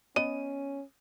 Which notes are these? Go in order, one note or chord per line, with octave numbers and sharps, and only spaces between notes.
B3 C#4 D#5 D#7